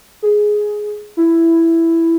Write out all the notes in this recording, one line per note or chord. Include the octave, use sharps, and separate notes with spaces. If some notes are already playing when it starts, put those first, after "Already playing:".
G#4
E4